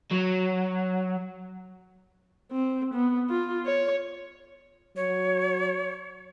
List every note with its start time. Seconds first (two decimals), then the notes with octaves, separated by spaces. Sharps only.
0.11 F#3
2.52 C4
2.94 B3
3.30 F4
3.66 C#5
4.96 F#3 C#5